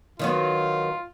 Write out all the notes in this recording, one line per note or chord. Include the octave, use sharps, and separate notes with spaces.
D#3 F#3 B3 F4